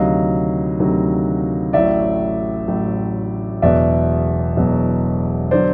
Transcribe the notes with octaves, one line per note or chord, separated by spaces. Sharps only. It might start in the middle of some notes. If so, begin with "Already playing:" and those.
Already playing: D2 C3 D#3 F#3 D#5 F5
D2 C3 D#3 F#3
A1 A2 F#3 D5 E5
A1 A2 F#3
E1 E2 B2 F#3 D5 E5
E1 E2 B2 F#3
D3 F#3 C5 D5